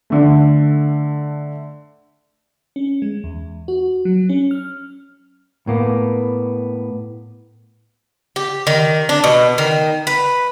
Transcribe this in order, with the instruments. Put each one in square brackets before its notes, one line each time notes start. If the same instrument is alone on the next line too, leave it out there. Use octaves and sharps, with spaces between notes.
[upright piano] D3 A3
[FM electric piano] C#4
G#3
E2
F#4
F#3
C#4
F6
[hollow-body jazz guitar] A2 A#3 B3
[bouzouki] G4
D#3
D4
B2
D#3
B4